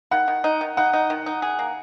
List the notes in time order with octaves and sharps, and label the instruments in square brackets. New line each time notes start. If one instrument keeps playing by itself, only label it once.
[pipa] D#3 [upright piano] F#5
[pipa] D#3
D#4
D#3
[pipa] D#4 [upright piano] F#5
[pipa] D#4
D#3
D#4
G#4
A#3